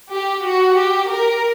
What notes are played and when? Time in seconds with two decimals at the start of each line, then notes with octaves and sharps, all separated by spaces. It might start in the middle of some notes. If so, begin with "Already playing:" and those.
0.11 G4
0.43 F#4
0.76 G4
1.08 A#4